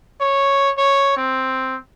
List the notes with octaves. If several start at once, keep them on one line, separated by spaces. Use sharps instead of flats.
C#5
C#5
C4